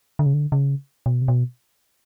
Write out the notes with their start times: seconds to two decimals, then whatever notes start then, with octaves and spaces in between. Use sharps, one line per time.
0.19 D3
0.26 C#3
0.34 D3
0.52 C#3
1.06 B2
1.22 C3
1.28 B2